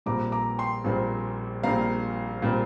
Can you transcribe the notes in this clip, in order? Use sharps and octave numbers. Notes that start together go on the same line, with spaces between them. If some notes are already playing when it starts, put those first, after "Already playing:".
A#1 A#2 G3 C4 A#5 D6
A#5 D6
G5 C6
A#1 A#2 G3 C4
A#1 A#2 G3 C4 F5 A#5
A#2 G3 C4